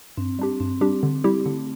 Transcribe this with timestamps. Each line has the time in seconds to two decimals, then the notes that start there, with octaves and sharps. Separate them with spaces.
0.17 G2 C4
0.39 G3 D4 G4
0.60 G2 C4
0.81 G3 D4 G4
1.03 D3
1.24 G3 E4 G4
1.45 D3 A3